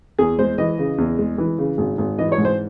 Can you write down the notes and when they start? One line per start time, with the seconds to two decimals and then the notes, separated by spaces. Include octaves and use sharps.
0.19 E2 G#4
0.39 G#3 C5
0.58 E3 D#5
0.79 C#3
0.98 E2
1.18 G#3
1.38 E3
1.58 C#3
1.78 G#1
1.98 G#1
2.18 E3 D#5
2.32 C#5
2.38 G#2
2.45 C5